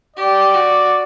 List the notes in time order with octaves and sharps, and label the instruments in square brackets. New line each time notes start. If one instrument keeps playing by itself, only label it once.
[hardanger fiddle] G4 [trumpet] D5
[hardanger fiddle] F#4